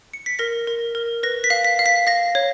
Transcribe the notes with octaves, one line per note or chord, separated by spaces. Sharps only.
C#7
B6
A#4 A#6
A#4
A#4
B4 A#6
B6
F5
B6
F5
B6
F5 A#6
C#5